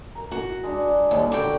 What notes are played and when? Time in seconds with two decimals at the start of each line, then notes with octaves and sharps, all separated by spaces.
0.15 A#4 A#5
0.32 F#4
0.63 G#3 D4
1.11 D#2 G3 A#3 F#5
1.32 D3 F#4 C#5 G5 D6